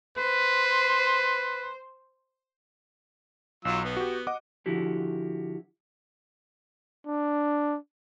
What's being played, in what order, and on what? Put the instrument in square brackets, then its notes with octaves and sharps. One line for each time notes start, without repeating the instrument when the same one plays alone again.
[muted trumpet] B4 [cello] C5
[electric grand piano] B1 [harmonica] F#3 F4 E6
[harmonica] B3
[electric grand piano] F#4 G4
D#5 F#5 D6
[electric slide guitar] D3 F3 E4 F#4 G4
[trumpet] D4